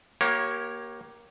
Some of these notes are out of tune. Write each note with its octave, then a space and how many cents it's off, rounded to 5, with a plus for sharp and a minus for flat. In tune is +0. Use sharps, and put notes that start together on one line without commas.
A#3 +15 G4 -25 C#5 -5